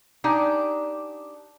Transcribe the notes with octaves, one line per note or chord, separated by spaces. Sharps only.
D4 D#4 G4 G5 G#5